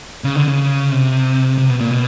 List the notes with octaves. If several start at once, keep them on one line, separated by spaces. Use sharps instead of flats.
C#3
D3
C#3
C3
C3
B2
A#2
B2